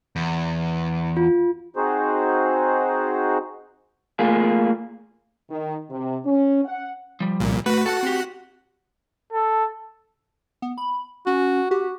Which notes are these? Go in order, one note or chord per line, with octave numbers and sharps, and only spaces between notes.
E2
F4
C4 D#4 F#4 G#4 C5
A3 A#3 F4 G#4
D#3
C3
C#4
F#5
F3 G3
C2 A#2
A3 F#4 B4
F#4 A4 F#5 A5
C4 G4
A4
B3
B5
C#4 F#4
F#4 G4